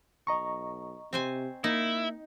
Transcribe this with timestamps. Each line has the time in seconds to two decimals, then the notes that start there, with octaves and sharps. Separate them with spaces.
0.27 B1 D#5 A#5 C#6
1.13 C3 C4 C5 G#5
1.64 A#3 D#4 E4